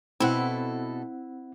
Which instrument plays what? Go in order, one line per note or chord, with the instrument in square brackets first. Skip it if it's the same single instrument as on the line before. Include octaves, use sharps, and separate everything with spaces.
[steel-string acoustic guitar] B2 A4 [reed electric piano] C4 F#5 [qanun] E4